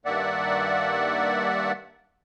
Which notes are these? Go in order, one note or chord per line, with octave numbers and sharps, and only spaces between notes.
G2 D#3 A#3 D5 E5 F#5